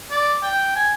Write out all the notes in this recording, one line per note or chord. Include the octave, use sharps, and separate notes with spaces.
D5
G5
G#5